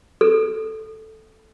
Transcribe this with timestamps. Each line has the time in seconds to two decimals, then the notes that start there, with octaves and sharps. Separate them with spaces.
0.21 A4